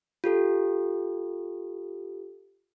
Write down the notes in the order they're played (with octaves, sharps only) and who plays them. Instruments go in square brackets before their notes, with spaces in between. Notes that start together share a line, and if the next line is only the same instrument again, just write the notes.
[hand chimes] F4 G4 A4